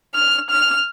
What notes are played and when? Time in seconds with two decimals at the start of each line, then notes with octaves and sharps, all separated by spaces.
0.14 F6
0.50 F6